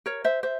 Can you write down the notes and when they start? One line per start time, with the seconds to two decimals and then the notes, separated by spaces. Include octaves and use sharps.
0.06 A#4 C#5
0.24 C5 E5
0.43 C5 E5